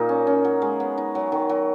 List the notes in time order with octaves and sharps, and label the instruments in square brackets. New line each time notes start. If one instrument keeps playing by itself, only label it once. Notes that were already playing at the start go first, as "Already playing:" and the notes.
Already playing: [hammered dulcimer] A#2 A#3 D#4
C#4
C#4
F#3
G#3
B3
D#4
F#3
D#3
F#3